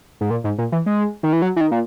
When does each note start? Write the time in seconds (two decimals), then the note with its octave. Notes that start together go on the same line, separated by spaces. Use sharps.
0.21 G#2
0.30 A#2
0.44 G#2
0.58 A#2
0.72 E3
0.86 G#3
1.23 D#3
1.33 E3
1.42 F#3
1.56 E3
1.61 D#3
1.71 A#2